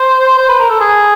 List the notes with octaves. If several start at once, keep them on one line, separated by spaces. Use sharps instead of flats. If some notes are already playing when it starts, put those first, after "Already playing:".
Already playing: C5
C5
B4
A#4
A4
G#4